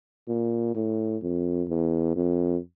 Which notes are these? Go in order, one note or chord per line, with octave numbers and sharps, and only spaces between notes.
A#2
A2
F2
E2
F2